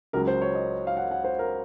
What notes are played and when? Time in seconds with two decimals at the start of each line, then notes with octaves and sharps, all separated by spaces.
0.13 C#2 C#3 F#3 A#4
0.27 C5
0.42 C#5
0.55 D#5
0.87 F5
0.97 F#5
1.11 F#5
1.24 C5
1.39 A#4